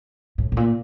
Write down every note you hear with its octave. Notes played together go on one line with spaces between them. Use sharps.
A2
A2
A#2